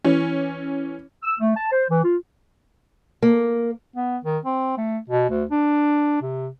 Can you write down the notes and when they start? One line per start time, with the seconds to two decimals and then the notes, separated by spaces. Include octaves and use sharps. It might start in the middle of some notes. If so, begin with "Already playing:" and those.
0.04 E3 C#4
1.23 E6
1.40 A3
1.56 A5
1.72 C5
1.90 E3
2.05 F4
3.22 A#3
3.96 B3
4.25 D#3
4.45 C4
4.78 A3
5.09 B2
5.30 D2
5.51 D4
6.22 C3